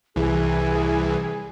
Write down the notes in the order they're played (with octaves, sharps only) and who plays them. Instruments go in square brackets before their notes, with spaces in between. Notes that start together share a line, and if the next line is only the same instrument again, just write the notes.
[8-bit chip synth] C2 E3 [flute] G#4